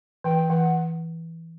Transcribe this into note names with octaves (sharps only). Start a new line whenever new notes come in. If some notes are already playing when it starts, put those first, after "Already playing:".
E3 G5
E3 F#5